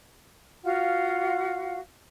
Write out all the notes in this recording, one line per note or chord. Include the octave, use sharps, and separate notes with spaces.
F4 F#4 F5 F#5